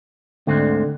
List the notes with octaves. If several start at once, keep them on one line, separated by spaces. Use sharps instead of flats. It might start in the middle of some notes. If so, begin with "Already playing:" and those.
D2 G#2 D3 C4